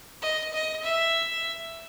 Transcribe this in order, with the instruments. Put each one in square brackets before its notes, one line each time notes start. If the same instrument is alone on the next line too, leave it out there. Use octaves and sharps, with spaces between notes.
[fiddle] D#5
D#5
E5